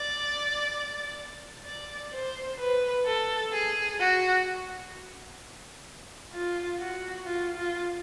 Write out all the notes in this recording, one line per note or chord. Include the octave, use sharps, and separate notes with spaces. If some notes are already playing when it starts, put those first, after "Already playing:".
Already playing: D5
D5
C5
B4
A4
G#4
F#4
F4
F#4
F4
F4